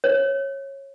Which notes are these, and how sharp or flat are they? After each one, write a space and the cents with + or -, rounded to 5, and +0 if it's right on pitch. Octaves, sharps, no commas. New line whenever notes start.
C#5 -20